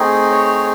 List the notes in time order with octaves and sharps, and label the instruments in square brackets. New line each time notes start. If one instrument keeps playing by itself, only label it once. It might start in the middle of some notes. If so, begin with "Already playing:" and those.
Already playing: [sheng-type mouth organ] A3 C4 D#4 G#4
C#5